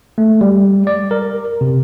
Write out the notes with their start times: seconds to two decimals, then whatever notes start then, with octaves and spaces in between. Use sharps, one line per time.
0.18 A3
0.41 G3
0.87 D5
1.11 A#4
1.61 C3